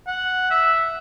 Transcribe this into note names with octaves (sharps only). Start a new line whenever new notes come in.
F#5
E5